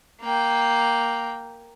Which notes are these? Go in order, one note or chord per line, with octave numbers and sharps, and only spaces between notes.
A#3 G5